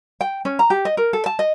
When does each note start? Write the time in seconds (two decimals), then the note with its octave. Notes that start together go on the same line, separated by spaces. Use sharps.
0.21 G5
0.45 C#4
0.59 A#5
0.70 G4
0.85 D#5
0.97 A#4
1.13 A4
1.26 A5
1.39 D#5